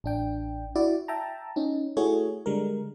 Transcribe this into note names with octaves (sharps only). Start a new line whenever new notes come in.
A1 D4 G5
E4 F#4 D5
E5 G5 A5 A#5
C#4 D#4
A3 E4 F#4 G#4 C#5
D3 G3 G#3 A#4